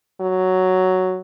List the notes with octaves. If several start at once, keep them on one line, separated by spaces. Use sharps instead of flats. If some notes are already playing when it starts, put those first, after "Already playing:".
F#3